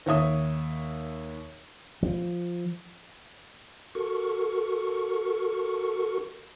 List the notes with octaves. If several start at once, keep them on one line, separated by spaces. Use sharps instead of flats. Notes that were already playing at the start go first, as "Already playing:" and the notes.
D#2 C#5 E5 D#6
F3
F#4 A4 A#4 C#6